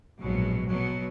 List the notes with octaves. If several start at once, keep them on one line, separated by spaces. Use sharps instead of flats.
A#1 G#2 B2 F#3
B2 F#3